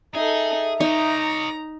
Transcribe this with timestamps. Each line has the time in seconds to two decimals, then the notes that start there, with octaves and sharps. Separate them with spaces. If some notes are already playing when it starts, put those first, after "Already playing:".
0.15 D#4 G#4 A4 E5
0.80 D#4 C#5 D#5 A#5